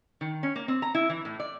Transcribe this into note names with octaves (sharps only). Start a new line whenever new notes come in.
D#3
C#4
A#3
C4
A#5
E4
E3
A2
D5